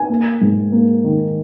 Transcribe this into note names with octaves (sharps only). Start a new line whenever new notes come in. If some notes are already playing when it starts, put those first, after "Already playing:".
Already playing: G#5
A#3
G#2
A#3
D#3